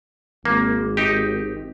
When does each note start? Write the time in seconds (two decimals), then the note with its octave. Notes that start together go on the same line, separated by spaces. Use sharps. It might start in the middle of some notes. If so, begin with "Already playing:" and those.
0.45 G#1 A#3
0.97 D#4 G4